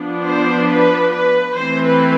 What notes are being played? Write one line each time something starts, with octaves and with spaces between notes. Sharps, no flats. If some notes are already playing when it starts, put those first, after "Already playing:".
Already playing: F3 B3 D4
C5
B4
B4
E3 A3 C4 C5
B4